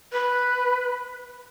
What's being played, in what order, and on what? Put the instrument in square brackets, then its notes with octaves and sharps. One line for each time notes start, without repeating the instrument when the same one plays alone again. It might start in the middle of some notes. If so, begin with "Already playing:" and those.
[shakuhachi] B4